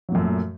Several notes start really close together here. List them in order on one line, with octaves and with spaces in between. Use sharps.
F#3 A#2 F#2 A3